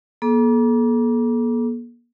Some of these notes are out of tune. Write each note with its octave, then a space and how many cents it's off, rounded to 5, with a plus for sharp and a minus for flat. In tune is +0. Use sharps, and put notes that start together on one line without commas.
A#3 +40 A4 -35 D6 -10